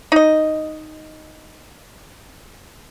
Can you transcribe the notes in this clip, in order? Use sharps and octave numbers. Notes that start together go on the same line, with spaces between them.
D#4 D#5